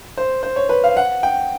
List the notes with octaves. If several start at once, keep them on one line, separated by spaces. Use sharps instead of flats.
C5
C5
C#5
B4
F5
F#5
G5